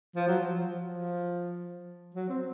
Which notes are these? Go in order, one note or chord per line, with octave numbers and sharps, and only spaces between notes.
F3
F#3
F3
F3
F#3
C4